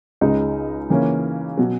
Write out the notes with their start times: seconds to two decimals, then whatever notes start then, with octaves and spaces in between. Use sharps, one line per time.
0.21 C#2 C#3 G#3 D#4
0.90 C#3 E3 A#3 C#4
1.58 B2 F#3